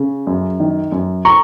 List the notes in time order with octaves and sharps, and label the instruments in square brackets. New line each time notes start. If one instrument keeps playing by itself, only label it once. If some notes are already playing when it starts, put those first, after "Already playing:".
Already playing: [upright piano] C#3
F#2
D#3
F#2
A#5 C#6